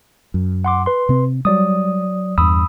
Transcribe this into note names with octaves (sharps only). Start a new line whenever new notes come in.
F#2
F#5 C6 D6
B4 C6
C3 C4
F#3 G3 D5 D#6
E2 G2 B5 D#6 E6